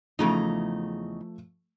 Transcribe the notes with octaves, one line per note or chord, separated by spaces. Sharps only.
E2 C#3 F3 A3 D#4